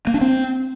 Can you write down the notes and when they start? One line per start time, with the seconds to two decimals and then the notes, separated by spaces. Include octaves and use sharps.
0.07 A#3
0.14 D4
0.21 C4